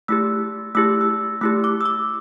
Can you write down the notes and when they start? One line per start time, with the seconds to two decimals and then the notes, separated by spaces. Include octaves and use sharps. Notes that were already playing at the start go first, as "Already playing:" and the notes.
0.08 A3 E4 G4 E6
0.75 A3 E4 G4 E6
1.01 E6
1.41 A3 E4 G4 E6
1.64 D6
1.81 E6
1.85 D6